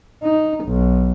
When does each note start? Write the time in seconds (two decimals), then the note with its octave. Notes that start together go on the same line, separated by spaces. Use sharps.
0.22 D#4
0.65 B1